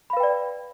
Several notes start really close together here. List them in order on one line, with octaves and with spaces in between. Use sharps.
B5 F5 B4 G5 D5